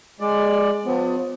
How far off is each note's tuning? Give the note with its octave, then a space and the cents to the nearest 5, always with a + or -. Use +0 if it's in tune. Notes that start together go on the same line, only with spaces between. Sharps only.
G#3 +0 D5 +15
F3 +40 B3 +35